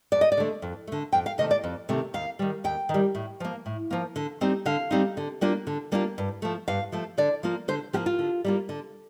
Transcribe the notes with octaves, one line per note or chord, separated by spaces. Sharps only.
F2 D5
D#5
D5
D3 A3
F2
D3 A3
F2 G5
F5
C3 D#3 A3 D#5
D5
F2
C3 D#3 A3
D#2 F5
D#3 G3
D#2 G5
D#3
G3
A2
F3 A#3
A2
F3 A#3
D3
G3 C4 D#4
D3 F5
G3 C4 D#4
D3
G3 A#3 D4 F4
D3
G3 A#3 D4 F4
G2
F3 A3
G2 F5
F3 A3
D3 D5
F3 A#3 F4
D3 C5
F3 A#3 F4 G4
F4
D3
G3 A#3 F4
D3